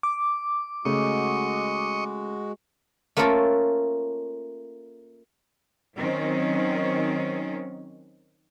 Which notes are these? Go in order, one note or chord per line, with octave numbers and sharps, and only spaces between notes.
D6
C#3 G#3 A3 F#4 D#5 C#6
A3 A#3 C#4 F4 A4 A#4
D#3 F#3 C4 C#4